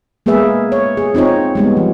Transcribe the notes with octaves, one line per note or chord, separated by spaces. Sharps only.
G#3 A#3 B3 G#4 B4 E5
C#5
G#4
C4 D#4 F4 C#5
G3 G#3 B3
F3